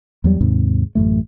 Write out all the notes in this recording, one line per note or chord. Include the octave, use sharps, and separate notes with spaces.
E2 F#3 G3
D#2 G#2 C3
A1 F#2 A#2 A3